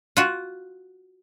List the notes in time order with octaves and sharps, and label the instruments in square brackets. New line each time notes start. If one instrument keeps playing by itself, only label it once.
[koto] F4 F#4